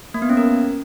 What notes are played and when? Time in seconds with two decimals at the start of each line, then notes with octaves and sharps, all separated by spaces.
0.14 A#3
0.22 B3
0.30 C#4
0.37 A#4